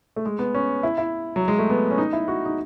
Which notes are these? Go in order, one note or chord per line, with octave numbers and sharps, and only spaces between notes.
A3
G#3
B3
C#4
E4
E4
F#3
G#3
A3
B3
C#4
D#4
E4
F#4
D#4